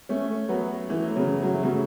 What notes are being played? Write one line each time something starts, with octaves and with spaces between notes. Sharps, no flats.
A3 C#4
F#3 B3
E3 A3
C#3 F#3
F#3
A3
C#3 F#3